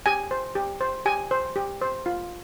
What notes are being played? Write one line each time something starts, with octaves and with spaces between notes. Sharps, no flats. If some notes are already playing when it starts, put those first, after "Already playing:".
G4 G#5
C5
G4
C5
G4 G#5
C5
G4
C5
F4